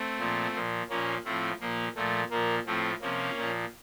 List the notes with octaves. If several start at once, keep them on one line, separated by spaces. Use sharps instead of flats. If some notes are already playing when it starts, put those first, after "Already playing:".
Already playing: A3 C4
A#2 F3
A#2 F3
A#2 F3 A#3 C#4
A2 F3 A3 C4
A#2 F3 A#3
A#2 F3 A3
A#2 F3 A#3
A2 F3 A3 C4
C3 F3 A#3 C#4
A#2 F3